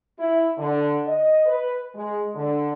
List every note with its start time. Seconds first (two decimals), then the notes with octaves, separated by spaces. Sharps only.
0.18 E4
0.57 D3
1.06 D#5
1.46 B4
1.94 G#3
2.35 D3